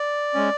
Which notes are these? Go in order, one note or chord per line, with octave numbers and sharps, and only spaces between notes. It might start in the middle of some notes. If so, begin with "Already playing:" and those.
Already playing: D5
G#3 C#4